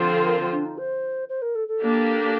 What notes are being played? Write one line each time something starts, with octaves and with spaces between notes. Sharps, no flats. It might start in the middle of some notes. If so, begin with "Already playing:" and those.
Already playing: D3 F3 C4 F4 C5
A4
A#4
D4
D#4
C5
C5
A#4
A4
A4
A#3 D4 G4